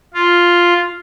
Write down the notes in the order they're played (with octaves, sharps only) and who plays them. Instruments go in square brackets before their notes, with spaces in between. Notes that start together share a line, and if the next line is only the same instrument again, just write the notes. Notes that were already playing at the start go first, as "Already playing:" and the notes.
[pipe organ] F4